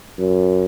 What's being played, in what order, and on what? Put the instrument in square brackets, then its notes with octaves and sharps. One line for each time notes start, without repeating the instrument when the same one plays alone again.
[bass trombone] F#2